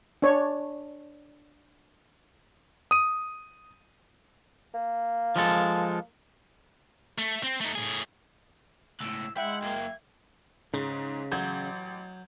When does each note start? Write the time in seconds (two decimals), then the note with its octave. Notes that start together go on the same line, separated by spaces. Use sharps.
0.22 D4 C#5
2.91 D#6 D#7
4.74 A#3
5.36 F3 G#3 A4
7.18 A3
7.43 C4
7.61 A3 D#4
7.75 A2 G#4
9.00 C#2 A2 E6
9.37 G#3 E4 E5 F#5 G5
9.62 F#2 A#3 G#6
10.74 G#2 C#3
11.32 A1 F#3 G6 G#6